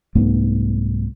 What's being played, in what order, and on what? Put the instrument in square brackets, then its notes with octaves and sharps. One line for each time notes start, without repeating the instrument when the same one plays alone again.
[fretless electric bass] C2 G#2 A3 B3